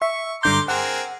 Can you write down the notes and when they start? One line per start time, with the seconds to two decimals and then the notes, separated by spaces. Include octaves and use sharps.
0.02 E5 C#6
0.43 G2 D3 A#5 C6 D6 G6
0.68 C4 G#4 A#4 F#5